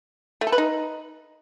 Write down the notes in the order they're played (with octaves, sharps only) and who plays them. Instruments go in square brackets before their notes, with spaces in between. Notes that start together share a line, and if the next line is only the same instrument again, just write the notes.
[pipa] A3
A4
B4
D#4